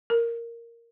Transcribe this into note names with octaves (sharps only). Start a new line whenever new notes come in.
A#4